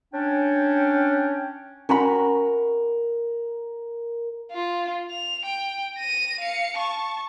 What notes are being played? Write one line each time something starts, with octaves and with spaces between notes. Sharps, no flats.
C#4 D4 G5
C#4 F#4 A#4 B5
F4
F7
G5
A#6 D#7
F5 C#7
A5 C#6